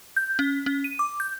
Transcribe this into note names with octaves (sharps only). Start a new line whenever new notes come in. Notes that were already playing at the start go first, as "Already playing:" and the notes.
G6
C#4
C#4
D#7
D6
G6